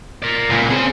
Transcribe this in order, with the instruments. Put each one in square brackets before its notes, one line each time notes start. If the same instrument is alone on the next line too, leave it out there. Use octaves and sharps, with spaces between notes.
[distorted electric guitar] A#4 D5
[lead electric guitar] C#2 A#2
[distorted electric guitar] C4 [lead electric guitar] C#4 G#4